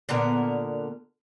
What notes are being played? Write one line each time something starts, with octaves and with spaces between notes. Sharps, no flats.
A#2 D3 B3 A#4